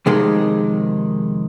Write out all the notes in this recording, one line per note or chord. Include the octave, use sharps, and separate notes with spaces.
F2 C3 D#3 G#3